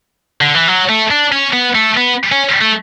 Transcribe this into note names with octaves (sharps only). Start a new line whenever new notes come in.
D3
E3
F#3
A3
D4
C#4
B3
A3
B3
C#4
A3